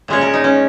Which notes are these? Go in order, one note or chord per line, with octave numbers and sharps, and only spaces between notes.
A#2 G#3 C#4 C#5
A#4
D#4
C#4